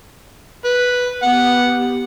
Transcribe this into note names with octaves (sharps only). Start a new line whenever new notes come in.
B4
B3 G4 F#5